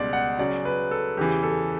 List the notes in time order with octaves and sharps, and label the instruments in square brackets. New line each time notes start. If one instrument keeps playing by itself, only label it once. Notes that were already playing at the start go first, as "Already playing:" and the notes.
Already playing: [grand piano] C#2 B2 G3 D5 F#5
F#5
C#3 F#3 C#4 D5
B4
A4
E2 C#3 E3 G4
A4